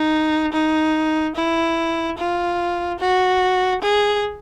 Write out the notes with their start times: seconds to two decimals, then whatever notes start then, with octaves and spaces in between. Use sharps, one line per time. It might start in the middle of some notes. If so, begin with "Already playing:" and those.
Already playing: D#4
0.53 D#4
1.36 E4
2.18 F4
2.99 F#4
3.82 G#4